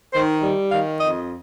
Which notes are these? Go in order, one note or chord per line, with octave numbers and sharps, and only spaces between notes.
D#3 C5
G3
D#3 F5
F2 D#5